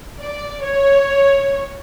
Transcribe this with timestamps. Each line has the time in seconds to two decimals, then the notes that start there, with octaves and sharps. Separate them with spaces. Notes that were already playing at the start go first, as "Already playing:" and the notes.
0.20 D5
0.62 C#5